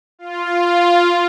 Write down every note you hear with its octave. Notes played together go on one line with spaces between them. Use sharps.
F4